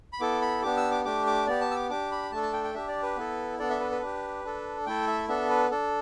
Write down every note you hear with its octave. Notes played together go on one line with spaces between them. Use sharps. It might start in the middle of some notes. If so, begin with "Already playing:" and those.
B5
B3 E4 A4 D6
B5
B3 D4 G4 D6
E6
D6
A3 D4 G4 D6
D6
B3 G4 D5
A5
E6
D6
D4 G4 D6
B5
A3 D4 A4 A5
A5
G5
G5
D4 G4 E5
D5
B4
B3 E4 A4
B3 D4 A4 D5
E5
B4
B4
D4 G4
D4 A4
A3 E4 A4 G5
E5
B3 D4 A4 E5
B4
D4 A4